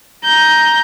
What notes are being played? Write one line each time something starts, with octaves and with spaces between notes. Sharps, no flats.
A#5 G6